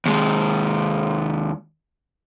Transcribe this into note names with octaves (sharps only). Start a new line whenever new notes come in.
D#2 G#3